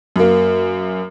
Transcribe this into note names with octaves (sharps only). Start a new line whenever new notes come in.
F#2 A#3